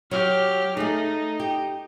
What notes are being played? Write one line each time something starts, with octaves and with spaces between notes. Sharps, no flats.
F#3 G4 F6
A3 D#4 G#4
G4